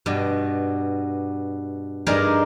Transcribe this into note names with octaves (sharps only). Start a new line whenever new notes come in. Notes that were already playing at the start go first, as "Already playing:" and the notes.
G2 B2
G2 D#4 G#4 A#4 D5 A#5